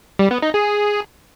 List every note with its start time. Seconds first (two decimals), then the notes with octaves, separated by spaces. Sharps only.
0.19 G3
0.31 B3
0.42 D#4
0.54 G#4